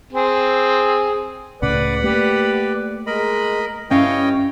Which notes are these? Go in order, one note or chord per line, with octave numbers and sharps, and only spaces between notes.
C4 G#4
C#2 A2 C#3 B4 D5 F#5 B5
A3 A#3 G4 B4 D5
G#3 A#4 D#5 B5
G2 C#4 E4 C#5 D#5 F5 G5